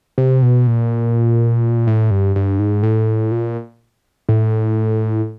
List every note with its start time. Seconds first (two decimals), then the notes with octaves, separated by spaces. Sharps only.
0.18 C3
0.42 B2
0.67 A#2
1.87 A2
2.11 G2
2.36 G2
2.59 G#2
2.83 A2
3.31 A#2
4.29 A2